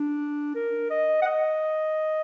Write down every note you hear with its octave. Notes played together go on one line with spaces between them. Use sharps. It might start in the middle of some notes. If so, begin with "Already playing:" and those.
Already playing: D4
A#4
D#5
F#5
D#5